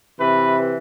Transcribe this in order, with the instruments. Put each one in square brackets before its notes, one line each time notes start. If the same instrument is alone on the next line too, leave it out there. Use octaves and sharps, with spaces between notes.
[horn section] C3 E3 B4